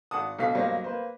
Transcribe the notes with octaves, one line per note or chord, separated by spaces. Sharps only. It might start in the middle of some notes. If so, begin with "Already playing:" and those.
G#1 F#5 A5 D#6
B1 B2 D3 F5 B6
B1 G2 F#3 G3 A#3 C5
A#3 B4 C5